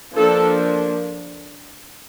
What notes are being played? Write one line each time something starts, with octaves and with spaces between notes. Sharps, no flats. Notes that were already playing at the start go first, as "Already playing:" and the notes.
F3 A#3 D4 A4